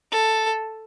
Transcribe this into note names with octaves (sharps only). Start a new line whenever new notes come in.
A4